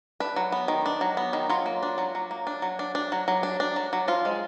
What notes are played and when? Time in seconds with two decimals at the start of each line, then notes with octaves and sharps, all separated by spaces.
0.20 D4 B4
0.36 F#3
0.52 B3
0.68 D#3
0.86 D4
1.01 F#3
1.17 B3
1.33 D#3
1.49 F#3 F4
1.66 A#3
1.83 D4
1.98 F#3
2.15 F#3
2.31 A#3
2.47 D4
2.62 F#3
2.79 D4
2.95 D4
3.12 F#3
3.28 F#3
3.43 D4
3.60 D4
3.76 F#3
3.93 F#3
4.08 F3 F4
4.25 G#3